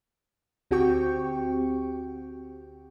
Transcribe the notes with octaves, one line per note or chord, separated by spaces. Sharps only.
D2 C4 F#4 G4 G5 C#6